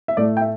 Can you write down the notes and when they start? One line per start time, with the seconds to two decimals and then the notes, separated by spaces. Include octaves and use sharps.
0.08 E5
0.17 A2 A3 D5
0.37 G5
0.41 E5